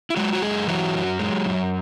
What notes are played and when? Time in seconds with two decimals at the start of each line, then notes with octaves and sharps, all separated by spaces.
0.10 E4
0.17 F#3 G#3 F#4
0.33 F#4
0.42 F#2 G#3 G#4
0.68 E3 F#3 F#4
0.95 F#2
1.19 G#3
1.46 F#2